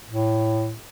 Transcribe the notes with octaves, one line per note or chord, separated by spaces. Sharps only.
A2